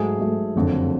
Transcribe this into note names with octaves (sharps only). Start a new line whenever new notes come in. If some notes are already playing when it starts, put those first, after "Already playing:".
Already playing: G#2 F#3 A3 G#4
G#2 F#3 A3
F#1 F2 D3